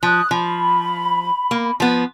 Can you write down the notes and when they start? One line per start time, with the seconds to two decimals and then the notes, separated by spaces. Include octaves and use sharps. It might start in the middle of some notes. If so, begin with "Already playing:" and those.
0.03 F3 D#6 F#6
0.31 F3 B5
1.51 A#3
1.80 F3 B3